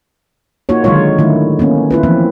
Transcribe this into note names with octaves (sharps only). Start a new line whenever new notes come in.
A#3 D#4 F4 F#4 C#5
D3 D#3 F#3 G#3 F4 C#5
D3 D#3 A3 E4
A#3 B3 C#4
E4 F4 B4
E3 F3 A#3 C4